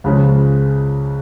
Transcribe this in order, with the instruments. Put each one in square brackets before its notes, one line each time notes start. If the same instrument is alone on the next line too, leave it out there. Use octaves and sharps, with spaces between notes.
[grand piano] C#2 C#3 F3 G#3